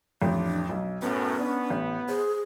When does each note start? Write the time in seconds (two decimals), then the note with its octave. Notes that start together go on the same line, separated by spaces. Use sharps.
0.22 A1 F2 D4
0.69 B1
1.02 F#2 A2 B3 C#4
1.39 B3 D4
1.70 A1
2.09 G#4 C5